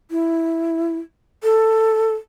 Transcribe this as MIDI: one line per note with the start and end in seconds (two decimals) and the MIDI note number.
0.11 0.98 64
1.43 2.13 69